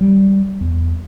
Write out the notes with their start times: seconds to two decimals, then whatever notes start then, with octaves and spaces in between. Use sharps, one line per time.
0.01 G3
0.61 E2